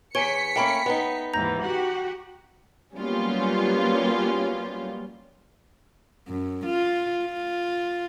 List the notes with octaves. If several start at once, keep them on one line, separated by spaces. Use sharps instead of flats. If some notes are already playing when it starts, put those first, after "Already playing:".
E2 C#5 G#5 B6 C#7 D7 G7
A3 A#3 C#4 G5 B5 D7
B3 D#4
D#2 G#2 E3 A#5 G6 A#6
F#4 G4 F#5
F#3 G3 A#3 B3 C#4 F4
F#2
F4
F4